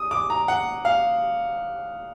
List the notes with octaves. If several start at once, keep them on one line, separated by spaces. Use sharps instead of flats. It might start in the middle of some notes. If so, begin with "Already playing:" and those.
Already playing: D#6
D6
A#5
F#5
F5